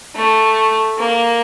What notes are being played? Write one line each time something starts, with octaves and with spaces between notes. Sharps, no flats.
A3
A#3